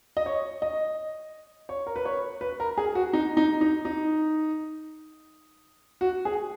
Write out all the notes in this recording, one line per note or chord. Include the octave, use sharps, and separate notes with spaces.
D#5
C#5
D#5
C#5
A#4
B4
C#5
B4
A#4
G#4
F#4
D#4
D#4
D#4
D#4
F#4
G#4